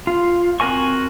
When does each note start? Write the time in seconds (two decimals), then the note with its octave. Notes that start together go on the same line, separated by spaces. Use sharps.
0.07 F4
0.60 C4 F#4 A#4 G#5 C#6